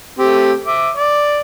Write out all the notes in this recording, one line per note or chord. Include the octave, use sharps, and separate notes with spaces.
A3 C4 G4
E5 D6
D5